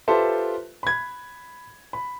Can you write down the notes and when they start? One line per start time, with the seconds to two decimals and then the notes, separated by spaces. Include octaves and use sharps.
0.08 F4 G4 A4 B4 C5 E5
0.83 B5 G#6
1.93 B5